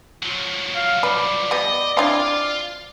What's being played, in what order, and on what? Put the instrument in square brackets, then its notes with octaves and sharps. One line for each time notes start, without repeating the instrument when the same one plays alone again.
[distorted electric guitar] F3 F#3
[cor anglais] F5
[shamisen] B4 [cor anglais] D5
[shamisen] G3 B3 [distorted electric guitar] D#5
[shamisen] C4 D4 E4 [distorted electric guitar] F4